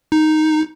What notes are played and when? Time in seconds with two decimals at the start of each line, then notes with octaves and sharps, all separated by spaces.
0.12 D#4